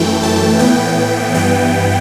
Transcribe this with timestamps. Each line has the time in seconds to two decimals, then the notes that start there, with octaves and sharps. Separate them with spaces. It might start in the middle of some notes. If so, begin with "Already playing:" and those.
Already playing: F#2 E3 A3 G5
0.23 A5
0.59 A2 E3 B3 G5
1.34 G2 E3 B3 G5